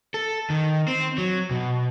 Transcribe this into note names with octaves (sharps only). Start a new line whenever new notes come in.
A4
D#3
C4
F#3
B2